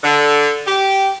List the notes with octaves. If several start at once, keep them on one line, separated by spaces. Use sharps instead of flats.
D3
G4